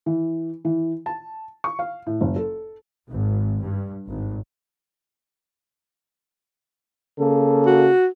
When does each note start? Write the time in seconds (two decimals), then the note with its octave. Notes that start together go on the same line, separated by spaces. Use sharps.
0.06 E3
0.65 E3
1.06 A5
1.64 C#6
1.79 F5
2.06 A2
2.21 F#1
2.36 A4
3.10 G#1
3.60 G2
4.07 G#1
7.18 C#3 A#3 A4
7.66 F#4